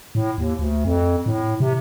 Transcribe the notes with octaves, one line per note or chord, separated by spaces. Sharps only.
A2
D#2
D2
F2
A2
C3